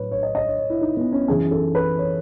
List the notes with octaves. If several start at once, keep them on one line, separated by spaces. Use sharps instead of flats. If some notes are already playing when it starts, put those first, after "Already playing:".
Already playing: A2 F#3 B4 C#5
C#5
D#5
D#5
C#5
C#5
E4
D#4
B3
C#4
F#2 E3 G#4
A4
B4
C#5